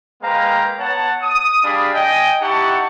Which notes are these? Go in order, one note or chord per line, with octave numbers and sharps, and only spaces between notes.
G#3 A#3 B4 F5 G5 A#5
B3 C#5 F#5 A5
D#6
G3 D4 G#4 F5 B5
D#5 G5 G#5
D#4 E4 G4 F#5 A5 C#6